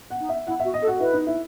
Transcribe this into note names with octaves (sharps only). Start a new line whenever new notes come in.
F#5
D#4
E5
E4 F#5
F#4 E5
D#5
A4
F#4
E4 B4
D#4
E4